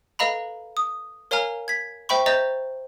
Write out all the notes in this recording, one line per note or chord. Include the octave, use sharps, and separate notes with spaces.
A4 B4 D#5 F5 A#5 B5
D#6
A#4 C#5 F5 G#5 A#5 F6
G#6 B6
C5 E5 G5 B5 C#6
C5 D#5 E5 A#5 G6 A6